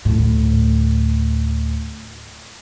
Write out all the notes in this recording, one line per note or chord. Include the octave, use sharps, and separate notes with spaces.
D2 A2